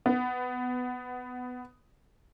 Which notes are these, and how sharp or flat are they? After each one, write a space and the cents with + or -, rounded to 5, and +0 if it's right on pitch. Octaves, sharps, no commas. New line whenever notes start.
B3 +15